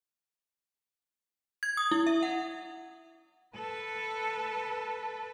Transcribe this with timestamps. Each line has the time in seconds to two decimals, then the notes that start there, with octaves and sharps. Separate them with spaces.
1.63 G#6
1.77 D#6
1.91 E4
2.07 E5
2.23 F#5
3.56 A4 B4